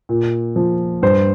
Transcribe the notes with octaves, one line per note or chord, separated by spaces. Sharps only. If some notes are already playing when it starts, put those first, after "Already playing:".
A#2
F3
G2 C5